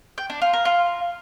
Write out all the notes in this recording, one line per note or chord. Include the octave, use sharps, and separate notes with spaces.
G5
D4
F4
A#4
F4